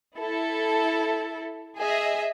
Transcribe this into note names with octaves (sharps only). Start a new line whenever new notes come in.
E4 A4
G#4 D#5 E5